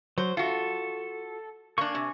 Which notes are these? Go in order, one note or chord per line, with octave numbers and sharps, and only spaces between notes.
F#3 C5
F4 F#4 A4
A#3 D4 G#5 C#6
C3